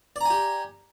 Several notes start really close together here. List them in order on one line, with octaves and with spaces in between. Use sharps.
D5 A#5 G#5 G4